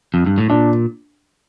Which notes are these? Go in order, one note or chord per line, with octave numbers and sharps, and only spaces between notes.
F2
G2
A2
A#2 D4